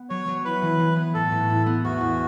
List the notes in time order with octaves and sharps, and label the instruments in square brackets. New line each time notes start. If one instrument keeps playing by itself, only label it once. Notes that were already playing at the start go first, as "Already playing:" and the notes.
Already playing: [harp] B3
[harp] F#3 [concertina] C#5
[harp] F#3
[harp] E4 [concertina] B4
[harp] E3
E3
B3
[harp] A2 [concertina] A4
[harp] A2
E4
B3
[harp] E2 [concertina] F#4
[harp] E2